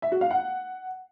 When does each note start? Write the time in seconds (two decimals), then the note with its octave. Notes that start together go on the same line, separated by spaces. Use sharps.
0.02 E5
0.12 F#4
0.21 F5
0.31 F#5